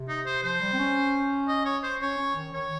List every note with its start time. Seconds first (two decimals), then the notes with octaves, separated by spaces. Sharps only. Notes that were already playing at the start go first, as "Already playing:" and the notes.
Already playing: C3
0.08 D#4
0.26 C5
0.43 F3 C5
0.60 G3
0.73 C4
0.79 C#4
1.48 D#5
1.65 C#5
1.83 C5
2.01 C#4 C#5
2.18 C#4
2.35 D#3
2.53 D#3 C#5